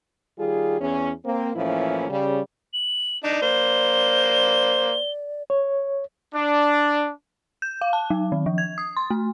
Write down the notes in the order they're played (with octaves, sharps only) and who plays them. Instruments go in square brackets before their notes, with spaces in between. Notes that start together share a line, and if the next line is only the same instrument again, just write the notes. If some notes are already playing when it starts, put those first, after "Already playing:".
[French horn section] D#3 G3 F4 G#4
E2 C#4
A#3 C4
A2 E3 F3 A#3 C#4 E4
C#3 G3
[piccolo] F#7
[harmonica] D4 D#4 [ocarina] D5
[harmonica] A#3 C5 [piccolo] G7
[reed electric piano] C#5
[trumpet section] D4
[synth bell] G6
F5
A5
F#3
D#3
F3
G#6
D#6
C6
A3